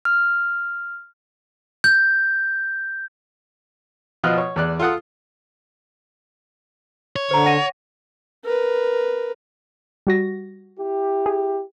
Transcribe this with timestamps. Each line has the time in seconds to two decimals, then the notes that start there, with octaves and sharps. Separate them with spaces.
0.05 F6
1.84 G6
4.24 B2 F3 F4 D#5 F6 F#6
4.38 C#5
4.56 E2 D5 F#6
4.80 F4 A4 F#5 D#6
7.16 C#5
7.31 D3 C5 A#5
7.45 F#5 A#6 D#7
8.44 A#4 B4
10.07 G3 F#4 A#6
10.78 E4 G4
11.26 G#4